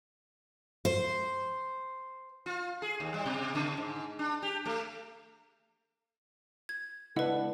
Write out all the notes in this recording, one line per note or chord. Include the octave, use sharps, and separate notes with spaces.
C5
F4
G#4
D#2
G3
B2
C#3
G#2
D4
G4
A3
G#6
C#2 B3 D4 E4 A4 B4 D#5 F#5